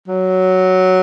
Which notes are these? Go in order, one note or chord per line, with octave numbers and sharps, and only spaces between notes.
F#3